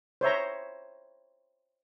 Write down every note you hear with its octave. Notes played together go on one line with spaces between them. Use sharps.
C5 C#5 E5 A#5